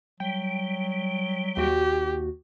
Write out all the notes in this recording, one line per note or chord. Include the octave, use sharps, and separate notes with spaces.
F#3 G3 G5
D#2 F#4 G4